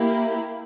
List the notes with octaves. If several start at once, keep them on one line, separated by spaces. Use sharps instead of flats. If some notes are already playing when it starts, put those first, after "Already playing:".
Already playing: A#3 E4 G4